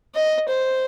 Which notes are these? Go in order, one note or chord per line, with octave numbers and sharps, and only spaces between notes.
D#5
C5